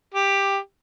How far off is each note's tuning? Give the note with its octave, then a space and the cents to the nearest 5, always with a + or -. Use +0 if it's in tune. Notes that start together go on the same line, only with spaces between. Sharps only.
G4 +10